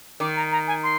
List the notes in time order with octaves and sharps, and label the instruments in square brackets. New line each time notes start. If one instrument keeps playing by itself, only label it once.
[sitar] D#3 [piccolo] D6
[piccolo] A#5
A#5
G#5
C6